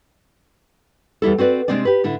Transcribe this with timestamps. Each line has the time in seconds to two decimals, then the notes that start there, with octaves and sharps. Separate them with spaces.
1.22 E2 G3 E4 A4
1.38 C4 F#4 B4 D5
1.68 C3 G#3 C4 D4 D5
1.85 G4 B4
2.04 A2 D3 E4